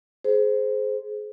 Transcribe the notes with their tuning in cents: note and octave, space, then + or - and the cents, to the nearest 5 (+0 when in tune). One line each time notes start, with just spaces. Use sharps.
G#4 +25 C5 -5